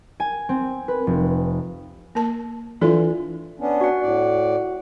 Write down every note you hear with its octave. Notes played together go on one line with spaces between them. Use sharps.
G#5
C4
B4
F1
A#3 A#4 A5
E3 D4 F4 A4 D5
B3 C#4 D4
F#4 F#5
A2 D5